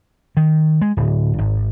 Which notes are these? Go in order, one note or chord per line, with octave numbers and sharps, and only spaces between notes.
D#3
G#3
D1
G#1